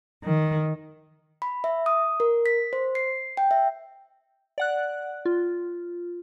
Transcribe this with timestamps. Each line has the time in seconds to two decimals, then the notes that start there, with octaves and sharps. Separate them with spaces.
0.24 D#3
1.42 B5
1.64 E5
1.86 D#6
2.20 A#4
2.46 B6
2.73 C5
2.95 C7
3.37 G5
3.51 E5
4.58 D5 F#5 F#6
5.25 F4